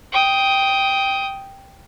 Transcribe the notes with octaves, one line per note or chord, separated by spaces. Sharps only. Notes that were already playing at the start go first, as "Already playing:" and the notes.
G5 D#6